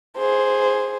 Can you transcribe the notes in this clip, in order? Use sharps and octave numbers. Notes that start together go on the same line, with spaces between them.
G#4 C5